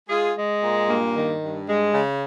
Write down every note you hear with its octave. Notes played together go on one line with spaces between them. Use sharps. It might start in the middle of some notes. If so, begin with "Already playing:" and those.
G#3 F4 G#4
G#3
A#2
G2 A#3
D#3
G2
G#3
C#3